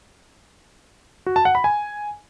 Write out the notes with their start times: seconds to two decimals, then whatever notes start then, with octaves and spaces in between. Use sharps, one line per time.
1.26 F#4
1.36 A5
1.45 F#5
1.55 B5
1.64 G#5